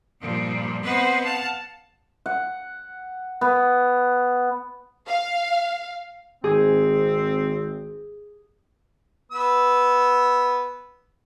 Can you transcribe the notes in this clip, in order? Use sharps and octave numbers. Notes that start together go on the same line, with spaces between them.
G2 A#2 F3 G3
B3 C4 B4 C5 D#5 F#5
F5 F#5 A5
F#5
B3
F5
G#1 C4 G#4
B3 B4 E6